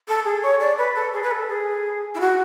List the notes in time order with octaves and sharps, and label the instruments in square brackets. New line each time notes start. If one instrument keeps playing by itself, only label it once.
[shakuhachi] A4
G#4
C#5
D5
B4
A4
G#4
B4
A4
G#4
E4
F#4